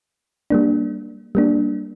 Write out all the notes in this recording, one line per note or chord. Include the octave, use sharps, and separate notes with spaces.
G3 A#3 D4
G3 A#3 D4